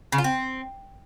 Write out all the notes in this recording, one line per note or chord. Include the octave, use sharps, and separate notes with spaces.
C#3
F4
C4